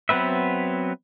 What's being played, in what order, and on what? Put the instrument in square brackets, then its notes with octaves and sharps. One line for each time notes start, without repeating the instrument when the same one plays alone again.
[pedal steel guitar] F#3 B3 C4 B4 E5